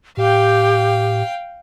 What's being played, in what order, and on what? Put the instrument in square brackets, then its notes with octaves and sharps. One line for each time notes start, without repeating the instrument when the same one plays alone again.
[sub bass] A2 [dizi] G4 [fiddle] F5 G5